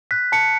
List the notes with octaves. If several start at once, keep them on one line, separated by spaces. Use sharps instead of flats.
F#6 B6
A5 C#7